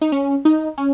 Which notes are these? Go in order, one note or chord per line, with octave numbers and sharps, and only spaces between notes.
D#4
C#4
D#4
C#4